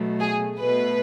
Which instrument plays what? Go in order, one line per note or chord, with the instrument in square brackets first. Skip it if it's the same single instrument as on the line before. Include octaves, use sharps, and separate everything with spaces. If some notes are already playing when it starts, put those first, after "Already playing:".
Already playing: [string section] B2 F#3 A3
G#4
B2 A3 B4